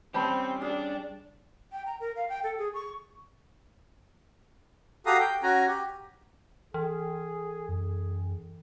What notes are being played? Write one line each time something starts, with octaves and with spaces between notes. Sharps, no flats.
G3 C4 C#4 G4 C5 A5 B5
D4 G#4
G5
A#5
A#4
F5
G5
A4
G#4
C#6
F#4 G4 A4 F5 A#5 D#6
G5
C#4 F#4 G#5 A#5
G4
E3 G#4
F#2 G#4